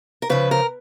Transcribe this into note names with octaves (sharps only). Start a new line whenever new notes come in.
A#4
C#3 F3 B4
A#4